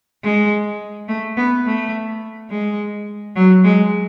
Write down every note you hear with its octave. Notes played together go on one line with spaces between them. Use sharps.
G#3
A3
B3
A3
G#3
F#3
G#3